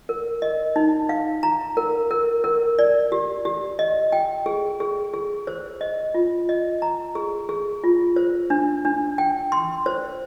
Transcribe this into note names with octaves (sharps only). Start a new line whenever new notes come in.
A#4
D#5
D#4
F5
A#5
A#4
A#4
A#4
D5
G4
G4
D#5
G5
G#4
G#4
G#4
C5
D#5
F4
D#5
A#5
G#4
G#4
F4
C5
D4
D4
G5
C6
C5